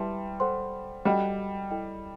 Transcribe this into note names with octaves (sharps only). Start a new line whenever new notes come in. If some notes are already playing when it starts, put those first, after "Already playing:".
Already playing: G3 E4 B4 E5 A5 C6
A4 C5 F#5 C6
G3 F#4 A4 D#5 F#5
E4 A4 D#5 G5